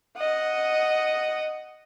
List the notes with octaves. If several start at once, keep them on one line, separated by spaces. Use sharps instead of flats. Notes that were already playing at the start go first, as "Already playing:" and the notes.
D#5 F#5